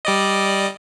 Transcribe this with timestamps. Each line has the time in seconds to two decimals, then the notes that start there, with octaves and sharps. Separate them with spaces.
0.05 G3 D5 D#5